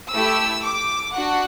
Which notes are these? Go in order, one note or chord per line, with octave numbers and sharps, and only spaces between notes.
A3 E4 G4 E6
D6
D4 F#4 F#5